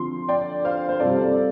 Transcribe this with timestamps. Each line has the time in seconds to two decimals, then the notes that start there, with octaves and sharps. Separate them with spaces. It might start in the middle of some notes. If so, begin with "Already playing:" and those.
Already playing: D3 F3 C4 F4 C6
0.29 D5 G5
0.65 C5 F5
0.89 C5
1.00 C3 G3 C4 F4 A4 D5